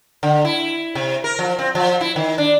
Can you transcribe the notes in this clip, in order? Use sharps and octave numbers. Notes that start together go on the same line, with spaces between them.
D3
E4
C3
A#4
F3
C4
F3
E4
D#3
D4